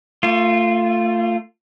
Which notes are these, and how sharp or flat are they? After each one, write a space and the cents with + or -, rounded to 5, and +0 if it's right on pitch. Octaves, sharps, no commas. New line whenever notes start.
A3 +30 F4 +0